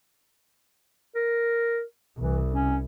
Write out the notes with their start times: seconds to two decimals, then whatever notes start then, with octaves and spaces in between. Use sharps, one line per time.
1.15 A#4
2.18 C2 E3
2.52 C#4